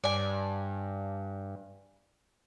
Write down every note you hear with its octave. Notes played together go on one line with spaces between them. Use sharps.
G2 D5 G#5